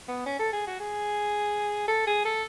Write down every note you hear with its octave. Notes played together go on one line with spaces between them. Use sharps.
B3
C#4
A4
G#4
F#4
G#4
A4
G#4
A4